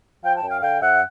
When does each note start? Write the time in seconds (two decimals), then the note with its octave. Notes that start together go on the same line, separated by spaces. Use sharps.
0.23 F3 F5 G5
0.36 G5 A5
0.43 F#2
0.49 F5 G5
0.62 D3 F5 G5
0.81 F#2 E5 F#5